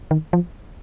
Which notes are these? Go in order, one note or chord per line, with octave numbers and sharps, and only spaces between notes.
D#3
F3